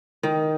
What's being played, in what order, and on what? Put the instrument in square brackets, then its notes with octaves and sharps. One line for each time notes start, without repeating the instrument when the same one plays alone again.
[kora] D#3